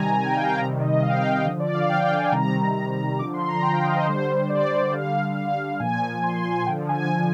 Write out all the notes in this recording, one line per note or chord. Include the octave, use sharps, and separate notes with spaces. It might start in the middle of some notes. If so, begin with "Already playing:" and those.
Already playing: C3 D#3 G3 G#5 A#5
G#5
G5
F5
G5
C3 D#3 G3 A#5
D#5
F5
G5
F5
G5
F5
D3 F3 D#5
D5
F5
G5
G#5
C3 D#3 G3 A#5
D3 F3 D6
C6
A#5
G5
F5
D#5
C5
D3 G3 C5
D5
D3 G3 F5
F5
A#2 F3 G#5
C6
G#5
D3 F3 G5
G#5